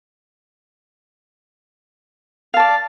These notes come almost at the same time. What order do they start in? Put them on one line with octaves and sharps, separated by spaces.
F5 A5 D5